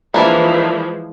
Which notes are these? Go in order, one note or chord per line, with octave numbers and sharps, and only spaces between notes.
E3 F3 G#3 A#3 D4 E4